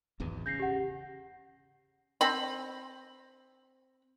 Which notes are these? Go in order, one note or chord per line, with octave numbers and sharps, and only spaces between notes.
D1 G#1 E2
C#3 G6 A#6 C7
G4 F#5
C4 B5